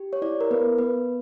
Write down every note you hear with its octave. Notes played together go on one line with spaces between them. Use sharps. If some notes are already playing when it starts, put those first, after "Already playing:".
Already playing: G4
C#5
E4 D5
A#4
B3 B4
B3 B4